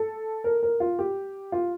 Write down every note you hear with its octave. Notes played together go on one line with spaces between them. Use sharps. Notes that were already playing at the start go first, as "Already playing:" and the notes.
Already playing: A4
A#4
A#4
F4
G4
F4